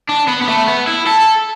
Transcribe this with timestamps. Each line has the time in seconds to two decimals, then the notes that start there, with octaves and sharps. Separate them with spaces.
0.09 D4
0.28 B3
0.42 B3
0.48 A3
0.68 B3
0.87 E4
1.07 A4